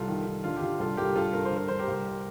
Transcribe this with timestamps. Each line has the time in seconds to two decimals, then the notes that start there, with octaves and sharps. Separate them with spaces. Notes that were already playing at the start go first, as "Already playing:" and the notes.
Already playing: C2 F4 A4
0.08 D#3
0.26 D#3
0.44 D3 F4
0.56 G4
0.62 D3 F4
0.80 C2 F4 A4
0.97 C2 G4 A#4
1.16 G2 F4 A4
1.33 G2 A#4
1.45 C5
1.52 D3 A#4
1.68 D3 C5
1.79 G4 A#4
1.88 C2